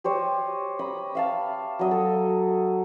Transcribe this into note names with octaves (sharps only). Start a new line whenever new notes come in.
G4 C5 C#5 D#5
D#5 A#5 B5
E5 F5 A5
F#3 D#5 E5
A4